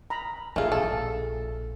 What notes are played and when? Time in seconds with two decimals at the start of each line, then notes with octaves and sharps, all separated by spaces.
0.10 A#5 B5
0.56 A#1 A3 F4 G#4 E5 G#5
0.72 A#1 A4